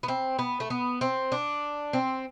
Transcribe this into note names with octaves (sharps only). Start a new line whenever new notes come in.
B3
C4
B3
A3
B3
C4
D4
C4